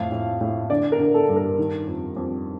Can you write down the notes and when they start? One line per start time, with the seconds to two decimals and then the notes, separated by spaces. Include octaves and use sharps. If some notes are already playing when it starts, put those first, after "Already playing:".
Already playing: F2 A2 F5
0.12 A2
0.41 A2
0.70 D3 D5
0.92 A#4
0.99 D3
1.14 A4
1.29 G2
1.36 A#4
1.58 D#3
1.87 F2
2.17 F2